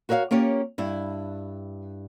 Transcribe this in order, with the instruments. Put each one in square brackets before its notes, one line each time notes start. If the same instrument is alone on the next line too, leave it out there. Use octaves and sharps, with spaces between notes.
[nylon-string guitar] F#4 A#4 C#5 E5 F5
A#3 C#4 F4 G4 C#5
G2 E4